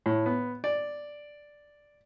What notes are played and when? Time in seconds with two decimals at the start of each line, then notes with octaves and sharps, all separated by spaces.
0.06 A2
0.26 B3
0.64 D5